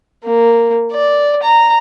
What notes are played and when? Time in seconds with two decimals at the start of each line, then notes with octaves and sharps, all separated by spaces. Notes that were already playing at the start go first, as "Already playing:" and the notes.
0.25 A#3
0.92 D5
1.42 A#5